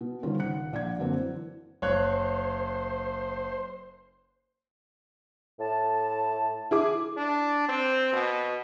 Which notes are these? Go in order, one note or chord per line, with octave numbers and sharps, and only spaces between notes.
B2
D3 D#3 G3 C#4 F4 C5
G#1 C#3 F#5 F#6 C#7
A#1 D5 F#5 G#6
F#2 D3 A#3 C4 D4
E3
F#1 C5 C#5 F#6
A2 A5
E4 G#4 D6
D4
C4
B2